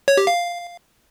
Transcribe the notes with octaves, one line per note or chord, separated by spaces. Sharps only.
C#5
G4
F5